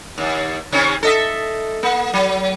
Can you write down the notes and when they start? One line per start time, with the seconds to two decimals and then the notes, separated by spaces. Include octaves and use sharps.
0.18 D#2
0.72 C3 D#3 C#4
1.03 A4 D#5 E5
1.83 A#3
2.13 F#3